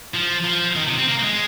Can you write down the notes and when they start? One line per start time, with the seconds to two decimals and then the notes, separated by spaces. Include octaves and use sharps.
0.14 F3
0.44 F3
0.76 D#3
0.87 C3
0.98 C4
1.08 A#3
1.19 A#3
1.23 G#3